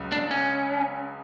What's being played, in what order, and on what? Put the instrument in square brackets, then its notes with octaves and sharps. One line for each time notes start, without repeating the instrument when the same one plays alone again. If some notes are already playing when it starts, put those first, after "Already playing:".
Already playing: [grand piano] C#2 C#3 F#3
[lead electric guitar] D4
C#4